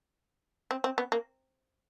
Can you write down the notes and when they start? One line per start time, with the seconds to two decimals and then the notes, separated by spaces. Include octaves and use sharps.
0.71 C4
0.84 C4
0.98 B3
1.12 A#3